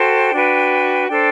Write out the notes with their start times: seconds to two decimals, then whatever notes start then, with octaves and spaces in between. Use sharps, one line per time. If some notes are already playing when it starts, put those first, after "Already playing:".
Already playing: F#4 A4 C5 G5
0.32 D4 F#4 B4
1.07 D4 A4 C5 G5